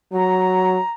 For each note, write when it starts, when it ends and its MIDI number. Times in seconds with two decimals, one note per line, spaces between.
0.13 0.78 54
0.13 0.92 82